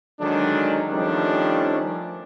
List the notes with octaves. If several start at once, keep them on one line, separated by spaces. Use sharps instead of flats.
D3 D#3 F#3 G#3 D4
D#3 F3 G3 A3 C#4 D4